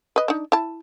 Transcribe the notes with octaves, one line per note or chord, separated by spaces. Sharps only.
B4 D#5
D4 D#4
E4 A5